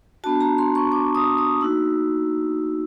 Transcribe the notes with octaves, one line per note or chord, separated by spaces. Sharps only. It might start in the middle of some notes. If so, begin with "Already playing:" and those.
B3 D4 F#4 A5
A#5
C6
C#6
D6
D#6
D#6
A#3 D#4 F#4 E6